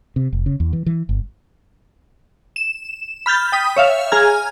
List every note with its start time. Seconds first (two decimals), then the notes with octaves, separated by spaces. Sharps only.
0.16 C3
0.33 F1
0.46 C#3
0.60 E2
0.73 E3
0.86 E3
1.09 G1
2.56 E7
3.26 B5 F6 G6 A6
3.52 G5 D#6 B6
3.77 C#5 E5 F5
4.12 G#4 G#5 A#5 F6 G#6